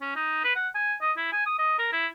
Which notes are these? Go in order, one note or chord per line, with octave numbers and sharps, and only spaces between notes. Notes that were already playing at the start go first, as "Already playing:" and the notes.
C#4
D#4
B4
F#5
G#5
D#5
E4
G#5
D#6
D#5
A#4
E4